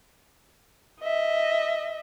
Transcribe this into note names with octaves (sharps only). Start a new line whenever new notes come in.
D#5 E5